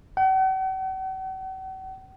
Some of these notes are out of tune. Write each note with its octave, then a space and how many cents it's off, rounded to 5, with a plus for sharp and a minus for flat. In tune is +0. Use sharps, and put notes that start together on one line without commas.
F#5 +45